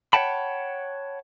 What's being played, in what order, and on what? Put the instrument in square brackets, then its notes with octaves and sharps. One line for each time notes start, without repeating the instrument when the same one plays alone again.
[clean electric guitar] C#5 E5 F#5 G5 A5 B5